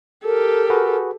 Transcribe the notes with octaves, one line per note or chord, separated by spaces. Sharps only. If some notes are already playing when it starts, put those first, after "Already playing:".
G4 A4 A#4
F#4 G#4 B4